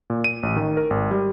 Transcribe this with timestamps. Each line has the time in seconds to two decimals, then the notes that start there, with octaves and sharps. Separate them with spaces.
0.10 A#2
0.24 D#7
0.43 A1
0.56 D#3
0.77 A#4
0.90 G#1
1.11 G3